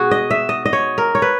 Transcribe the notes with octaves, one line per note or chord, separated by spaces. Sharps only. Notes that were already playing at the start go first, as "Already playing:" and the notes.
Already playing: B2 F#4 G#4
D#5
E5
D#5
D#5
C#5
A#4
C#5
B4